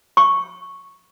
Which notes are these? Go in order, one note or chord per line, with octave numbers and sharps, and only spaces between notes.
C#6